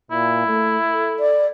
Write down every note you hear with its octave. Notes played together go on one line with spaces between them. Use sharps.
A#2 E4
A3
A4
D5